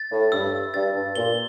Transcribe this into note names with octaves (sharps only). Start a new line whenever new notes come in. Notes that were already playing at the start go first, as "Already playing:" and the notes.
Already playing: A6
A2
G2 E6
G2 A6
G2
A#2 G7